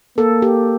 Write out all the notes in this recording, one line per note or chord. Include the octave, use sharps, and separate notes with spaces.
A#3 A4
G4